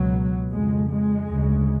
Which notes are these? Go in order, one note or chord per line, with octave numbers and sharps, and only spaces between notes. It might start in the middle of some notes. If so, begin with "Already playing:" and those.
Already playing: C#2 B2 F#3
F2 C#3 G#3
G#3
D2 C#3